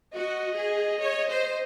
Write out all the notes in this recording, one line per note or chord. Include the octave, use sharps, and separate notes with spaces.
F#4 D#5
G#4
C#5
C5